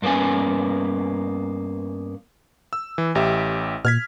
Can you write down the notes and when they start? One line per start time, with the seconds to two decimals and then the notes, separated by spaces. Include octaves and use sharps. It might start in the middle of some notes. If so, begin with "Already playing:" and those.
0.02 G2 A#3 B3 C#4 G#5
2.73 E6
2.98 E3
3.15 A1 G4 E5
3.85 A#2 F6 G#6 B6